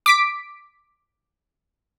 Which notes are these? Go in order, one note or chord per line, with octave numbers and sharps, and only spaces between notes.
D6 B6 D7